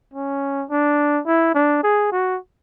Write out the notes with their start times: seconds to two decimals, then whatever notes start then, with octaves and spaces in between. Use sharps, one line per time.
0.13 C#4
0.70 D4
1.26 E4
1.55 D4
1.83 G#4
2.12 F#4